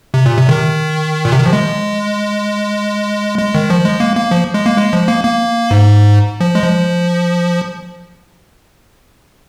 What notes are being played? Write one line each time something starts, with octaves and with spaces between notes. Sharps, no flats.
C3
A#2
C3
D#3
A#2
C3
D#3
F3
G#3
G#3
D#3
F3
G#3
A#3
A#3
F3
G#3
A#3
G#3
F3
A#3
A#3
G#2
F3
G#3
F3